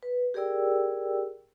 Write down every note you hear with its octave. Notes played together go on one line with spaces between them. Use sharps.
B4
G4 G#4 A#4 D5 G5 E6